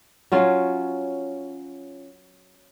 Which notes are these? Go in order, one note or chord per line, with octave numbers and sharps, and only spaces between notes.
F#3 C#4 F4